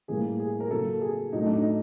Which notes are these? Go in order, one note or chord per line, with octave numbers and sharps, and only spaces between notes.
A2 E3 G3 A#3 G#4
G#4
A#4
C#3 F#3 A#3 A4
G#4
A2 F#3 A3 D#4
D4
D#4